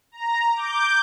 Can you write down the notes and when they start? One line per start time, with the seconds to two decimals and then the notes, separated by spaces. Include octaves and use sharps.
0.12 A#5
0.53 D6 G6